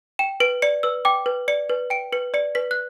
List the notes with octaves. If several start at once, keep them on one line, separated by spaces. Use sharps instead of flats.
G5 E7
B4 D7
D5 C#7
B4 E6
G5 D6
B4
D5 C#7
B4
G5 D7
B4 C#7
D5 C#7
B4 B6
F#6